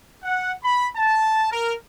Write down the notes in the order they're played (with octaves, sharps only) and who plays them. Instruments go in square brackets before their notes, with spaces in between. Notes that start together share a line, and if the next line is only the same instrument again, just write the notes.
[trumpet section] F#5
B5
A5
A#4